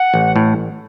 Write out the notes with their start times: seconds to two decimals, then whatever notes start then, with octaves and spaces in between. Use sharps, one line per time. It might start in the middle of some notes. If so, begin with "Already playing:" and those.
Already playing: F#5
0.14 A1
0.36 A2